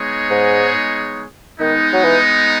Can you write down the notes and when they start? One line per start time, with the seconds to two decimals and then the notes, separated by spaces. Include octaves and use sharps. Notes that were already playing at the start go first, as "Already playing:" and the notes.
Already playing: G#3 B3 D#4 G#4 C#5
0.30 G#2
1.60 D#3 G#3 B3 D#4
1.93 F#3
2.04 E3